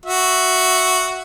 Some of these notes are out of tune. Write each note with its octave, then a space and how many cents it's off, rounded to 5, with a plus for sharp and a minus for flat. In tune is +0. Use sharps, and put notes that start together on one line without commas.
F#4 +0 E5 +0